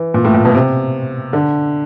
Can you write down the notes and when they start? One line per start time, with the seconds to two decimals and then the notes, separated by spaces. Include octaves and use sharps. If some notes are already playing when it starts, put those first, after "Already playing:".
Already playing: E3
0.14 A#2
0.25 A2
0.34 A#2
0.45 B2
0.54 C3
1.33 D3